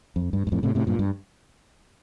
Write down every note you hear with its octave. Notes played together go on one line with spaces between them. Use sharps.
F2
G2
G2
F2 A2
A2 C3
A2 C3
G2 A#2
G2